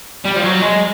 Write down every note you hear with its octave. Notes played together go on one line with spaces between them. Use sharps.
G3
F3
F#3
G#3